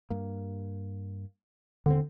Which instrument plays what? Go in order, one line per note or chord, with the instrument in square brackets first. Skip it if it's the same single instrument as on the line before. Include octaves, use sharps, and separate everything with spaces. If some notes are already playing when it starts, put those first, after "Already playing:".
[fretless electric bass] G2 A#3
[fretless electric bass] E1 D#2 C4 [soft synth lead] D3